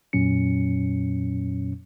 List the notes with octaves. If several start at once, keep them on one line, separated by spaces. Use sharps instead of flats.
F2 A#2 F#3 C#4 C#7